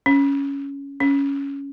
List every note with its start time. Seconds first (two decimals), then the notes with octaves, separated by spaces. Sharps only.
0.06 C#4
1.00 C#4